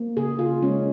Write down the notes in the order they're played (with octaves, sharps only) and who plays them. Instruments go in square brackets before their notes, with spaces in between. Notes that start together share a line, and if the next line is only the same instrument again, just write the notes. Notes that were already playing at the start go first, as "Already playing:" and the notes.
Already playing: [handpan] A#3
C#3 G#4
C#3 F4
G#3 C#4